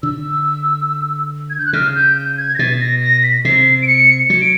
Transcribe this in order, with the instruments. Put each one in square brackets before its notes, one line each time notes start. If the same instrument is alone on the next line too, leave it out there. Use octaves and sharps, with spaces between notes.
[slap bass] D3 [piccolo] E6
[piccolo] G#6
G6
F#6
[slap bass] C#3 [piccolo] F6
[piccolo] G6
G6
G#6
A#6
[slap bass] B2 [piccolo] A6
[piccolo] A#6
A#6
B6
[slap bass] C3 [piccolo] C7
[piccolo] D7
C#7
[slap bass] F#3 [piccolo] C#7
[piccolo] D7